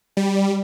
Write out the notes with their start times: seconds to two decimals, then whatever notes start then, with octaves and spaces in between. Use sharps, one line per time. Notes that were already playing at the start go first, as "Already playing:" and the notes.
0.17 G3